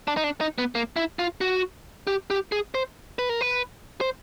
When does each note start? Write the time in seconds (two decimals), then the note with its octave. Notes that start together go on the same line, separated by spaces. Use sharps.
0.08 D4
0.17 D#4
0.24 D4
0.41 D#4
0.58 B3
0.75 A#3
0.96 E4
1.19 F4
1.41 F#4
2.07 G4
2.30 G4
2.52 G#4
2.75 C5
3.19 B4
3.29 A#4
3.41 B4
4.01 C5